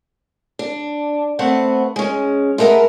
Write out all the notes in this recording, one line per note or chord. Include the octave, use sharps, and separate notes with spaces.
D4
A3 B3 C4 F#5
G#3 C#4
G#3 A3 B3 A#4 E5